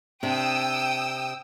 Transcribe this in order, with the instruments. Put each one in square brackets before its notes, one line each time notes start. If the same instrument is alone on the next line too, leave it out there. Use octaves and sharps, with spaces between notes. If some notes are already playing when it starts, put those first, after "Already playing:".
[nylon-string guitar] C3 D4 [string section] G5 D#6 E6